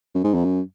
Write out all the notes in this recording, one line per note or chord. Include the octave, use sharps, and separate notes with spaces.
F#2
G#2
F2
F#2